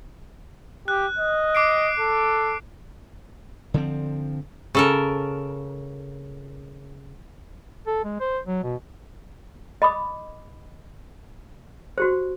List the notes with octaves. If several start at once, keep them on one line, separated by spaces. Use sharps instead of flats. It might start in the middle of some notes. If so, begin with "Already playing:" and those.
G4 F#6
D#5
D6 C7 D7
A4
D3 F3 C4
C#3 A4 A#4
A4
G#3
C5
F#3
B2
D#5 B5 D6 D#6
F#4 G4 C5